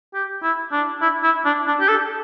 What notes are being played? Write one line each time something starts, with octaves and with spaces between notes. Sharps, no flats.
G4
E4
D4
E4
E4
D4
D4
G4
A4